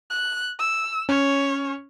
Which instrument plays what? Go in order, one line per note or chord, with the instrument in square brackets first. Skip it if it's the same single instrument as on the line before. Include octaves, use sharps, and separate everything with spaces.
[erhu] F#6
E6
[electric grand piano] C#4 [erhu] C#5